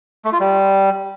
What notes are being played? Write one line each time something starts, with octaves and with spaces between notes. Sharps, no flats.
A3
F4
G3